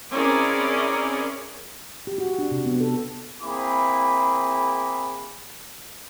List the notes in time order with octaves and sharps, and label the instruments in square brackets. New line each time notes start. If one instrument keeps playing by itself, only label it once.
[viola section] C4 C#4 E4 G#4 A#4 D5
[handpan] G4
F#4
D4
C3
B3
A4
[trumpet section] A#3 C4 E4 G#4 B5 D6